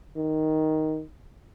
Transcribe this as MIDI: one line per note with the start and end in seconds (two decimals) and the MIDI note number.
0.17 1.02 51